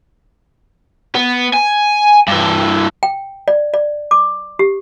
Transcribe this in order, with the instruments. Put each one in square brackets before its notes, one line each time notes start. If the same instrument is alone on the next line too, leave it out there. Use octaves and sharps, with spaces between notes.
[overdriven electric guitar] B3
G#5
G2 E3
[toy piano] G5
D5
D5
D6
G4